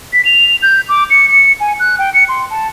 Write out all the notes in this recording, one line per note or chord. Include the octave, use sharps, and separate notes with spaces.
B6
F7
G6
D6
C#7
C#7
G#5
F#6
G5
C#7
C6
A5